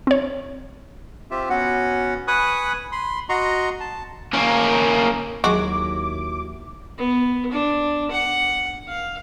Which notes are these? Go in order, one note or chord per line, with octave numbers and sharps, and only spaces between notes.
C4 C#5
C4 F4 G4 E5
B3 C#4 F#4 F#5
B4 G#5 B5 C#6 D#6 F#6
B5 C6
F#4 D#5 A#5 C6 C#6
A5
A#3 C#4
D#2 F#3 G#3 E4 F#4 D6
B3
D4
F#5
F5